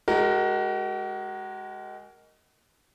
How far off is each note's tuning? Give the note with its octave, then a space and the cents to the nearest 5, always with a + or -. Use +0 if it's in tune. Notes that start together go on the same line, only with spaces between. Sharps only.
G#3 +0 F#4 +35 A#4 -5